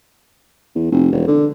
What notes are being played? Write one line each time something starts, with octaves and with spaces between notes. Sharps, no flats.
E2
F1
E1
D3